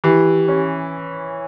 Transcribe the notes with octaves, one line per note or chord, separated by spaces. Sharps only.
E3 G4
C#4